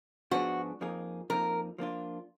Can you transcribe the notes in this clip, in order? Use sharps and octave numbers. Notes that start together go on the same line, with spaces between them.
G#2 F3 B3 D4 F#4 G#4
F2 F3 A#3 D#4 G#4
F2 F3 A#3 D#4 A#4
F3 A#3 D4 F4